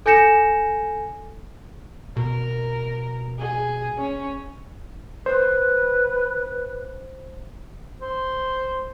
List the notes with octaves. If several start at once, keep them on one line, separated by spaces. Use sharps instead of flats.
A4 G#5 G6 A#6 C#7 E7
B2 A#4
G#4
C#4
B4 C5
C5